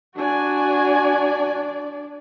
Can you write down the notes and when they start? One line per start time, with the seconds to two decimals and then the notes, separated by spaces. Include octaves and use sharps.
0.16 D4 F#4 D5 G#5